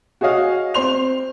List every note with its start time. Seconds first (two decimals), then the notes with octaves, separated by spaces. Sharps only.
0.21 F#4 G#4 C#5 D#5 F5
0.74 C4 C6 F7